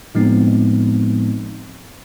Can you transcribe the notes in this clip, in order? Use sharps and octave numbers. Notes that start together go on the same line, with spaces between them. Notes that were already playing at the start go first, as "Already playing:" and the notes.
A2 F3 G#3 B3 C4 D#4